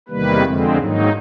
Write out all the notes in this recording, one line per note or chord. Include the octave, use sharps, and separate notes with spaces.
E2 C3 D#3 G3 A#3 B4
F2 D3 F3 G#3 C4
G#2 D#3 F#3 A#3 D#4